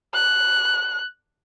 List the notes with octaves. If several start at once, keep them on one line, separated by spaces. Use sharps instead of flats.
F#6